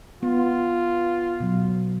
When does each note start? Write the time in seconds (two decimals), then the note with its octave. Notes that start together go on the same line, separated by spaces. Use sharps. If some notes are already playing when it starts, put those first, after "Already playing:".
0.23 B3 F4
1.40 B2 F#3